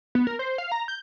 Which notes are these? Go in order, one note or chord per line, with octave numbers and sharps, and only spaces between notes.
B3
A#4
C5
F5
A#5
G6